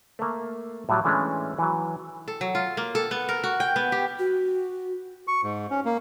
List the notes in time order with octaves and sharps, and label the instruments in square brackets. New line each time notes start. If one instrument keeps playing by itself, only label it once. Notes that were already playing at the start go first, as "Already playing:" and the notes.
[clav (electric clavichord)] A3 A#3
A2 F#3 G3
E3 G#3 A3 C#4 D4
E3 F#3
[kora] A4
F#3
F4
A#3
A4
B3
A#4
F#4
G5
B3
G4
[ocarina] F#4
[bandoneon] C#6
G#2
C#4
A#3